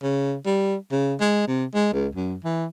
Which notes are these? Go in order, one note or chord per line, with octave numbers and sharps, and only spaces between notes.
C#3
G3
C#3
G#3
C3
G#3
C#2
F#2
E3